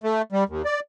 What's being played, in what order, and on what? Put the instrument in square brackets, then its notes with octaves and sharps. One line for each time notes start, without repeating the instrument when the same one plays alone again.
[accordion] A3
G3
D#2
D5